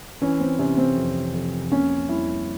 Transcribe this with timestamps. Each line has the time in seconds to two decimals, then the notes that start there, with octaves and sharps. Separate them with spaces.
0.22 E3 C#4
0.40 C4
0.59 C3 C#4
0.77 C4
0.97 F2
1.34 F2
1.71 A#3 C#4
2.09 G3 E4